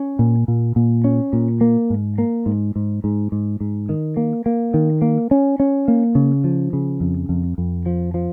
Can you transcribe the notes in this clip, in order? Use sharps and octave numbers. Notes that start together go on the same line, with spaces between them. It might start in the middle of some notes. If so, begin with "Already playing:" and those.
Already playing: C#4
A#2
A#2
A#2
C#4
A#2
A#3
G#2
A#3
G#2
G#2
G#2
G#2
G#2
D#3
A#3
A#3
D#3
A#3
C#4
C#4
A#3
C#3
F3
C#3
F2
F2
F2
F3
F3